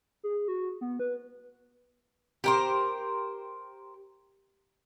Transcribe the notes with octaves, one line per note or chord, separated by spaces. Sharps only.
G#4
F#4
B3
B4
G4 A#4 C5